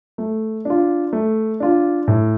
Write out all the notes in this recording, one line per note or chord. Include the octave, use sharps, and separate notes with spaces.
A3
D4 F4
A3
D4 F4
A2